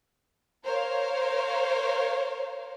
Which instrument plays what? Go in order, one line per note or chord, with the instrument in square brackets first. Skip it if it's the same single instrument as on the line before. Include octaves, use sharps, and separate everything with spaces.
[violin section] A#4 C5 C#5 F5